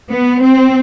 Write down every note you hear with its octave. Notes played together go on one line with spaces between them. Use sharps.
B3
C4